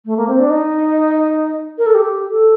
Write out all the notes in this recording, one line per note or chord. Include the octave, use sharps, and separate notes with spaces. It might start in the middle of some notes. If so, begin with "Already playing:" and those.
A3
A#3
C4
D4
D#4
A#4
A4
G4
A4